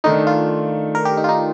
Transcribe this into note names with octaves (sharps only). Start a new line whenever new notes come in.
D#3 A3 D4 D#4
F4
A#4
G4
D#4
F4
D#4